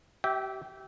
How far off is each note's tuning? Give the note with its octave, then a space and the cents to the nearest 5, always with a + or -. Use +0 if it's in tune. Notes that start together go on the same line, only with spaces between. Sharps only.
G4 -30 E5 -15 G5 +0